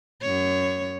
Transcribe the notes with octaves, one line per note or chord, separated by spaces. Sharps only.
F#2 C#5